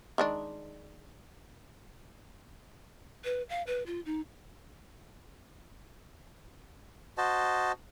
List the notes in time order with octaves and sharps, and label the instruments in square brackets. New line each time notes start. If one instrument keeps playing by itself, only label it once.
[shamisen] D#3 G#3 D4
[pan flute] B4
F5
B4
F4
D#4
[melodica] F#4 C5 D#5 A5